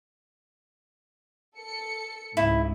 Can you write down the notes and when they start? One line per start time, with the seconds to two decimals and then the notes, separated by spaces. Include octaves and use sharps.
1.56 A4 C#7
2.37 C#2 G#2 C#3 E4